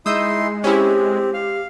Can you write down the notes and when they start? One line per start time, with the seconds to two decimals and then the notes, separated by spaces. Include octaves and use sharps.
0.06 G#3 D#4 E4 C6 D#6 E6 G6
0.64 C4 C#4 E4 G4
1.34 F5